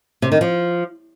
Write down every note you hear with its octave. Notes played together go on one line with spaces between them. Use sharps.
C3
D#3
F3